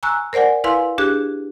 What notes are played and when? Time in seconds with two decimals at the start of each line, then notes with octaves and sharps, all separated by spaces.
0.03 G#5 A#5 C#6 E6 F#6
0.33 A#4 C5 D5 F#5 G#5
0.64 E4 B4 F5 G#5 C6
0.98 D4 G4 G#4 F#6